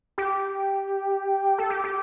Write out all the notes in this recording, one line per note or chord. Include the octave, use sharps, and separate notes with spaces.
G4
A4
G4
G4